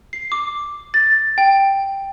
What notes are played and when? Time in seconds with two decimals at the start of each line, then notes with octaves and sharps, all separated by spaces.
0.13 C7
0.32 D6
0.94 A6
1.38 G5